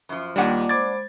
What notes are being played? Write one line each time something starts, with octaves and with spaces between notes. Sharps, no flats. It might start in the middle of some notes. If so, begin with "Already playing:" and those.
F#2 F3
D#2 G3 A#3 D4 F4 D#5 F#5
G#3 C5 B5 D6 G#6 A6